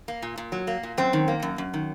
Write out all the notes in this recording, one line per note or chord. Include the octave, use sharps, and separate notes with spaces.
A#3
A#2
A#2
F#3
A#3
A#2
F#2 C4
D#3
A#3
F#2
F#2
D#3